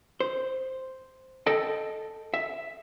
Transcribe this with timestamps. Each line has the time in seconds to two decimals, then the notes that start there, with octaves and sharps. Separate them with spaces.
0.20 C5
1.47 A4 D#5 G5 A5
2.34 E5